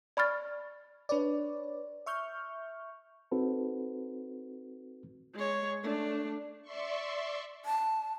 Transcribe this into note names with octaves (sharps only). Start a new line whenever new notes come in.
D5 B5 C#6 F6 A6
D4 B4 C#5 D5
E5 C#6 F6 G6
C4 D#4 F#4 A4 B4
G#3 C#5
A3 D4
D5 E5 C6 C#6
A5